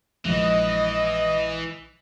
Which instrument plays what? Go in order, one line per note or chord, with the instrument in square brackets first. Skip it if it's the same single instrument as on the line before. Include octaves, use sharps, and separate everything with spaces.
[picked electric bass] A#1 F3 G#3 [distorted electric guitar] E3 [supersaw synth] D#5